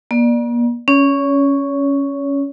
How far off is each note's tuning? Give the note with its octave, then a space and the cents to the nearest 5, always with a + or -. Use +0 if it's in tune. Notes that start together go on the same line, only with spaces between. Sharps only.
A#3 +40 D5 +15
C#4 +0 C#5 +30